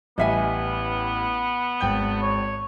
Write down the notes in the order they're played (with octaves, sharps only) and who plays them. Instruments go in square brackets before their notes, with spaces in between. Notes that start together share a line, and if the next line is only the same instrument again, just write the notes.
[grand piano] A1 G3 [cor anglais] B3 [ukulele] D#5 E5 G#5
[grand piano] G#1 G5 G6
[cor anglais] C#5